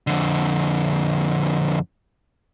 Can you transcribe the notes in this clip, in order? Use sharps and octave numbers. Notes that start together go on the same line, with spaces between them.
F2 D3